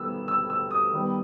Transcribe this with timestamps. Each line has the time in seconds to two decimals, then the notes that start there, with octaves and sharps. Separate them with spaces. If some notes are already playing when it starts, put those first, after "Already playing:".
Already playing: D#3 G3 B3 E6
0.28 E6
0.50 E6
0.71 D#6
0.93 D#3 G3 B3